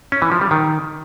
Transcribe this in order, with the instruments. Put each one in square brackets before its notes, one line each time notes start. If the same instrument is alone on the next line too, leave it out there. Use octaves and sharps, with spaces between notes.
[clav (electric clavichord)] C#4
E3
F3
G3
D#3